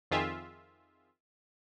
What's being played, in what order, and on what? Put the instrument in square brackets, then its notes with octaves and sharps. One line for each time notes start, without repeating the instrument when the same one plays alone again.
[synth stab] F2 D#3 F4 G#4 E5